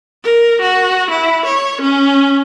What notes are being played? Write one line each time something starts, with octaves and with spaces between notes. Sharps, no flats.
A#4
F#4
E4
C#5
C#4